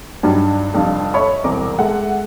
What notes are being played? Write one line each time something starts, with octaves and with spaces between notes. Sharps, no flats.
G2 F#3 G3 D4 D#4
F1 F2 G3 D4 F5
C#5 D#5 E5 A5 B5 C#6
E1 C2 C4 A#5 D6
G#3 A4 E5 F#5